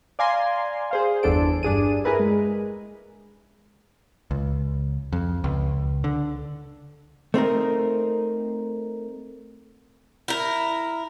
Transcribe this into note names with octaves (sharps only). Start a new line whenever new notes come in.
D5 F5 G#5 A#5 C6
G#4 C5 F5
G1 E2 D4 A4 D7
G2 D4 G#4 D#7
E4 G#4 A#4 B4 E5
G#3
C#2
F2
C#2
D3
A3 C4 D#4 A#4
E4 A#4